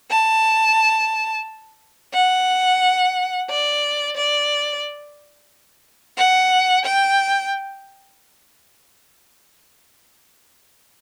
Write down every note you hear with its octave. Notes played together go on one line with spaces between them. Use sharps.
A5
F#5
D5
D5
F#5
G5